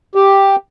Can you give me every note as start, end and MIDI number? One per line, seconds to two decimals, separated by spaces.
0.15 0.56 67